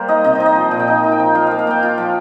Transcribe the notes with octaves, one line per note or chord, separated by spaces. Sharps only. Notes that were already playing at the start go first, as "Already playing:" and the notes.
Already playing: G3 A#3 C5
D#4 D#5
C3 D#5
D#4 C5
D#5
F3
A#2
G5
D#4 F5
D#4
G5
F3
F4 F5
A#3 F5
F5
A#3 G5
F4
F3